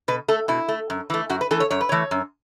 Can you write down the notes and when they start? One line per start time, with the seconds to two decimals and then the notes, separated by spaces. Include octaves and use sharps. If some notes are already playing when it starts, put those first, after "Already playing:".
0.08 B2 B4
0.28 A3 A4
0.48 B2 E4
0.68 A3
0.90 F#2
1.10 E3 A3
1.29 F#2 F#4
1.41 B4
1.51 E3 A3 A4
1.60 C#5
1.70 F#2 C#5
1.81 B4
1.89 E3 A3 C#5
2.11 F#2